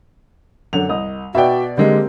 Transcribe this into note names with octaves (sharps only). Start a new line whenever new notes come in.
F#2 D3 F7
C2 D#5 D#6
B2 F#4 B4 D5 E5 G5
D3 G#3 A#3 C4 G4